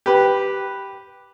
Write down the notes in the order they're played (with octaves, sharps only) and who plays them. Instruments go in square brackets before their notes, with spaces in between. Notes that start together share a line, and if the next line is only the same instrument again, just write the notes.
[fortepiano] G4 B4